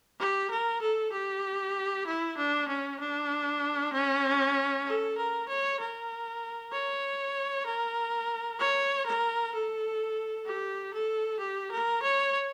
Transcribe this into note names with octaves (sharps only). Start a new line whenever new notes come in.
G4
A#4
A4
G4
E4
D4
C#4
D4
C#4
A4
A#4
C#5
A#4
C#5
A#4
C#5
A#4
A4
G4
A4
G4
A#4
C#5